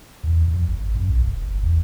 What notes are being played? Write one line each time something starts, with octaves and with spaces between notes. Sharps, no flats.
E2
F2
G#1
F#2
B1
E1
G1
E2